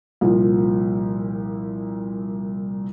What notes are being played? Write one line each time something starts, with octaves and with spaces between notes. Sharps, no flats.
C2 A#2 F3